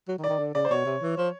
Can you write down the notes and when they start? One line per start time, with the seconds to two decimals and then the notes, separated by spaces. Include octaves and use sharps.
0.08 F#3
0.18 D#3
0.24 D5
0.29 D#3
0.39 D3
0.55 C#3 D5
0.65 C5
0.71 B2 C#5
0.86 C3
1.02 E3
1.18 F3